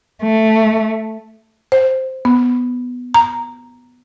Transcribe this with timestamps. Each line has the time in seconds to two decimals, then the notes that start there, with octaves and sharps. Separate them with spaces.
0.24 A3
1.72 C5
2.25 B3
3.14 A#5